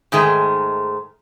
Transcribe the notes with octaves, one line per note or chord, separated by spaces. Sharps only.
G#2 D#3 G#3 A3